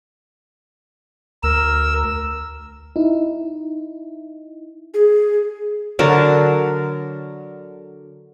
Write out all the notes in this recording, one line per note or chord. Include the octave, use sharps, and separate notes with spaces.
D2 A#4 E6
D#4 E4
G#4
D3 F#3 A#4 A5